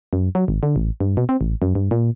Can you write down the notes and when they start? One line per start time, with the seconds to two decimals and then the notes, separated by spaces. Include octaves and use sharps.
0.13 F#2
0.35 F#3
0.48 G#1
0.63 D3
0.76 A1
1.00 G2
1.17 B2
1.29 C4
1.41 A1
1.62 F#2
1.75 G2
1.91 A#2